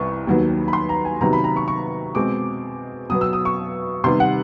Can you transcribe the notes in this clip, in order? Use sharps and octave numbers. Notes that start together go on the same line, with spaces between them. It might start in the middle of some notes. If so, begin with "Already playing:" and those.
Already playing: C2 C3 E3 B3 C#6
D#2 D#3 F#3 B3
B5
C6
A#5
G#5
C3 D#3 F#3 B3 A#5
B5
A#5
C#6
C#6
B2 G#3 C4 D6
B2 F#3 B3 D#6
E6
D#6
C#6
C3 D#3 G3 B3 C6
F#5